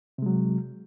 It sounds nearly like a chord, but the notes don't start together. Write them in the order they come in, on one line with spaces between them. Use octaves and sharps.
C3 G#3 F#3